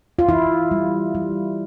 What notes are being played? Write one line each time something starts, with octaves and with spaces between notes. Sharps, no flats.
F4
E3 E4
G3
G3